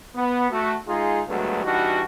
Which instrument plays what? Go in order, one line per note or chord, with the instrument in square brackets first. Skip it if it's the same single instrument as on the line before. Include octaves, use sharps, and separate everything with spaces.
[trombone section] B3
A3 F#4
G#3 D#4 F4 G#4
D2 G2 F#3 G#3 A3 B3
E3 G3 D4 D#4 F#4